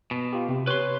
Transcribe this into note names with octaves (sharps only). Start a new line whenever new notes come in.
B2
F4 G4
C3
B4 C#5 C6